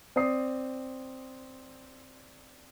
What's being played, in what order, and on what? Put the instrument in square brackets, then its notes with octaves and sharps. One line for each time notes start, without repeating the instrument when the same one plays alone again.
[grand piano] C4 D5 D#6 C7